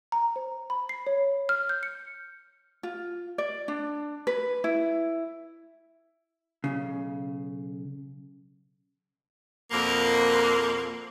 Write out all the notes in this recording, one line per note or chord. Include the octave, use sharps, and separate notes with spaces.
A#5
C5
B5
C7
C#5
F6
G6
C#7
F4
D5
D4
B4
E4
B1 F#2 C#3
F2 B2 A#3